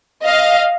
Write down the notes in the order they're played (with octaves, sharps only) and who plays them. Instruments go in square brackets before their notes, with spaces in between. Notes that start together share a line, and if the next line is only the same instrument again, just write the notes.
[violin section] D#5 F5